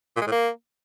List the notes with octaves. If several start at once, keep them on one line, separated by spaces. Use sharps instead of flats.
A#2
G#3
A2
A#3